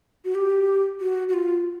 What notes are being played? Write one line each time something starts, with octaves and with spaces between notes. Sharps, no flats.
F#4
G4
F#4
F#4
F4